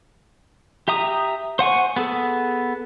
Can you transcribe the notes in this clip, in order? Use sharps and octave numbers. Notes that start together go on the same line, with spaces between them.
G4 E5 A#5 D#6
C5 F#5 G#5 C#6
B3 G#4 A4